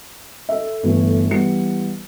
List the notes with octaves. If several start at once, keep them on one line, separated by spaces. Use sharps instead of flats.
A4 E5
G1 E3 A3
E3 G3 B3 C#7